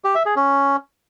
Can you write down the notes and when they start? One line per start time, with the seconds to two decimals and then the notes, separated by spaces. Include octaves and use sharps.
0.05 G4
0.15 E5
0.26 G#4
0.36 C#4